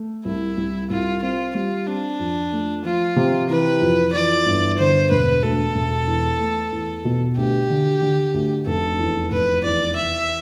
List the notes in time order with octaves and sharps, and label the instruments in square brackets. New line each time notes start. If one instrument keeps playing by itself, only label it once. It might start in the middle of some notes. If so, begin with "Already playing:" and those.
Already playing: [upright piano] A3
[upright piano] C2 [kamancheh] E4
[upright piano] C2
[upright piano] C2 [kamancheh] F4
[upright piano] C4 [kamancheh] F4
[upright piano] G3 [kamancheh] F4
[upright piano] C4 [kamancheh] D4
[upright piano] F2
A3
[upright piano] F3 [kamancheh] F4
[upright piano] C3
[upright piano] E3 [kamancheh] B4
[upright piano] F2
[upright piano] E3 [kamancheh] D5
[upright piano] G1
[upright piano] D3 [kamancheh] C5
[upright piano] E1 [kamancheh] B4
[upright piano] D2 [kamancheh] A4
[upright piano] E1
E2
A3
E2
B2
[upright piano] D2 [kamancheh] G4
[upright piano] D3
D3
D2
[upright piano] F1 [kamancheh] A4
[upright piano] E2
[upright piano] F1 [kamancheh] B4
[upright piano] E2 [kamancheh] D5
[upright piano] E3 [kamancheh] E5